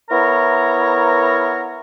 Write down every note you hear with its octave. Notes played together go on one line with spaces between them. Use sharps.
B3 E4 A#4 C#5 A#5